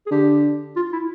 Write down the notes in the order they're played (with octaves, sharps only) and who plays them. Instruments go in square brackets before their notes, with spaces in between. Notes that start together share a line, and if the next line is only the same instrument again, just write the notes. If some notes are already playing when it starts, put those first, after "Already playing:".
[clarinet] G#4
[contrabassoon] D3 [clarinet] G4
[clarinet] F4
E4